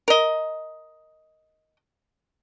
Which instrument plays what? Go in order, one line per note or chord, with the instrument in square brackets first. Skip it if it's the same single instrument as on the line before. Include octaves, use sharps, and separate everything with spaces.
[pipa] A#4 D#5